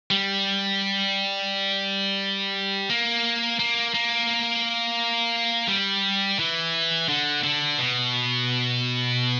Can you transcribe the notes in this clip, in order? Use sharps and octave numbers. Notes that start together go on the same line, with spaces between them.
G3
A#3
A#3
A#3
G3
E3
D3
D3
B2